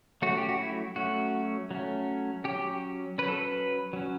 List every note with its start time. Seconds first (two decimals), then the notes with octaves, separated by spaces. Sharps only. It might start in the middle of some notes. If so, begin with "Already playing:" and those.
0.22 F#3 A3 C#4 F#4
0.37 G4
0.49 F#4
0.59 E4
0.96 F#3 A3 C#4 F#4
1.71 F#3 A3 C#4
2.44 F#3 C#4 G4
3.18 F#3 C#4 B4
3.28 A4
3.38 B4
3.93 F#3 C#4